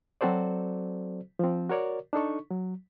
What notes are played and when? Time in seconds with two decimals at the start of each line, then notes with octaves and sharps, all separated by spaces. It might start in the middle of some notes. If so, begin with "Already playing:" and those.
0.21 F#3 C4 F#4 A4 C5 D5
1.39 F3 C4
1.70 F#4 A#4 C#5 D5
2.13 D4 D#4 A4 C#6
2.51 F#3